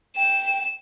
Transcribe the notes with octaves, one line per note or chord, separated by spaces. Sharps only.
G5 E7